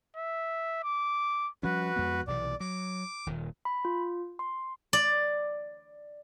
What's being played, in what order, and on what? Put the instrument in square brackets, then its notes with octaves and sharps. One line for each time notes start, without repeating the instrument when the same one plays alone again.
[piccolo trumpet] E5
D6
[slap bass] F3 G3 C#4 [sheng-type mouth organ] F#4 B4
[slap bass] F2 G#3 B3
[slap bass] B1 C3 E3 [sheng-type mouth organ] D5
[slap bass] F#3 [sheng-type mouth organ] D6
[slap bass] D#1 A#2 D#3
[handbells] B5
F4
C6
[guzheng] D5